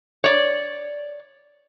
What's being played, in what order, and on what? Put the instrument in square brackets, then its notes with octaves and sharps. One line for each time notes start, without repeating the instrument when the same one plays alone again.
[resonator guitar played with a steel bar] C#5 D5